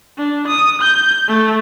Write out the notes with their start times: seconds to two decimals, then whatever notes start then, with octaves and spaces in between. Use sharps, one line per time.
0.18 D4
0.48 D#6
0.81 G6
1.28 A3